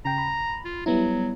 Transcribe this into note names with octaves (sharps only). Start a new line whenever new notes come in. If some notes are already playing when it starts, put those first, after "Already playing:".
C#3 G5 A#5
B5
F4
F#3 G3 B3 E4